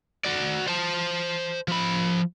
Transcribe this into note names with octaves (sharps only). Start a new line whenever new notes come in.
F#4 D5
C5 A5
F3 B5